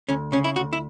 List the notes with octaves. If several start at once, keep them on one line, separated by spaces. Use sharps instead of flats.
D2 C#4
C#3 C#4
E4
D2 F#4
E4